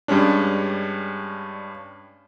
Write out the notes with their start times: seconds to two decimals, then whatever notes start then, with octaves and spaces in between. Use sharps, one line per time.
0.08 G2 G3 G#3 C#4 D4